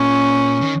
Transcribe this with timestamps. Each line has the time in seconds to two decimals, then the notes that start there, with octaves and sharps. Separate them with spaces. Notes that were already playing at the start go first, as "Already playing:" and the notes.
Already playing: A#2 C#4
0.62 D#3